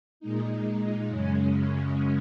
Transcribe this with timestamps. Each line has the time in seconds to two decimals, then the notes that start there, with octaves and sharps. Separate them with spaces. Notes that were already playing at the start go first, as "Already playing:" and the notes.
0.20 A#2 G#3 D#4
1.09 F#2 C#3 G#3 C#4